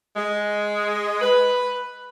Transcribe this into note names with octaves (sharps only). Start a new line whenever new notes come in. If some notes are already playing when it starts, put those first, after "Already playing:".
G#3
B4